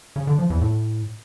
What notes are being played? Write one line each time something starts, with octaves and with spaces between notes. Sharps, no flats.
C#3
D3
F3
E2
A2